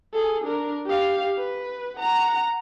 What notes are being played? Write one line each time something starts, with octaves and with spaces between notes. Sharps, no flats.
G#4 A4
D4 A#4
G4 F5
B4
F#5 A#5